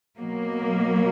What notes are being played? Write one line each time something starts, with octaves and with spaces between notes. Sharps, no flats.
B2 F#3 A#3